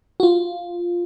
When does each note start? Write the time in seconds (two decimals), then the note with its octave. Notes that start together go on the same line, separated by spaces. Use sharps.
0.20 F#4
0.23 F4